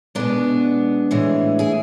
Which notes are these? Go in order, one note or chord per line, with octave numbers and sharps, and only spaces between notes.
B2 G#3 B3 D4
A2 E3 G#3
E4 G#4